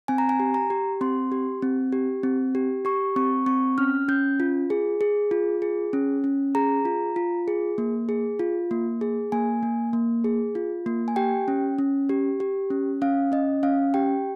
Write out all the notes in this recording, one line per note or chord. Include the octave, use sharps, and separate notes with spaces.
C4 G#5
A#5
G#5
G4
A#5
G4
C4 C6
G4
C4
G4
C4
G4
G4 C#6
C4 C#6
C4 C#6
C#4 F6
C#4 G6
F4
G#4
G#4
F4
G#4
C#4
C#4
G#4 A#5
F4
F4
G#4
A#3
G#4
F4
A#3
G#4
A#3 G#5
A#3
A#3
G#4
F4
A#3
G#5
G4 G5
C#4
C#4
G4
G4
C#4
C#4 F5
C#4 D#5
C#4 F5
G4 G5